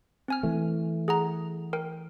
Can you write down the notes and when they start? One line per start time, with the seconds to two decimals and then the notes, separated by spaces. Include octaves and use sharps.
0.28 C4 G#5 F6
0.43 E3 A3
1.08 G#4 F#5 A#5
1.73 A#4 G5